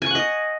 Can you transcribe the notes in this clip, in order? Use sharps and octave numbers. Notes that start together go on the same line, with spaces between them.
D#5 F#5 G#5 C#6